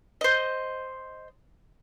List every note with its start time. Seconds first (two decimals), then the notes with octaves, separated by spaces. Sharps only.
0.21 C5 D#5